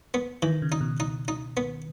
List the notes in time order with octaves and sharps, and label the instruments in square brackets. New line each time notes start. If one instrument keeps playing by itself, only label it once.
[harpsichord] B3
[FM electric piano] D#3 [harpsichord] E3
[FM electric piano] C#3
[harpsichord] D#4
[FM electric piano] B2
[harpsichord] D#4
D#4
B3